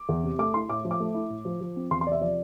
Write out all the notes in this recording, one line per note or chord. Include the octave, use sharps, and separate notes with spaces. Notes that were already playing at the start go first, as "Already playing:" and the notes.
Already playing: D6
E2
C3
A3 D6
E4 C6
A2 D6
F3
D6
A3
E4
A2
F3
F3
C4
E2 C6
C6
C3 D5 E5
F3 D5